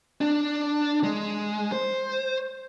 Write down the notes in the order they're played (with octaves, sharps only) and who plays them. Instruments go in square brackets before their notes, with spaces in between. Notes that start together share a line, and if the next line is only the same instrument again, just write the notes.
[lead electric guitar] D4
G#3
C5